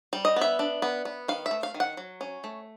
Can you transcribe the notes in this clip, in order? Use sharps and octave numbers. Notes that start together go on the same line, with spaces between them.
G3
D#5
B3
E5
D4
B3
B3
D#3 F5
E5
A3
F5
D#3
F#5
F#3
C#4
A3